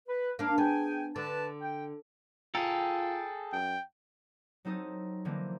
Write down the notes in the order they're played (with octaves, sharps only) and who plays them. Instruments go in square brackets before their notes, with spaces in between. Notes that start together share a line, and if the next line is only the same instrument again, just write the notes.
[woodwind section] B4
[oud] A#3 D4 [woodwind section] F5
[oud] B3 [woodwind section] G#4 G5 G#5
[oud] D3 [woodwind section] B4 A5
[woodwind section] G5
[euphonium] F4 [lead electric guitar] G#4 A4 [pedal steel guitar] G5 A#5
[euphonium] F#2 [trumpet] G5
[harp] F#3 C4 D#4 A4 D#6
D3 E3 F3 A#3 C4 D#4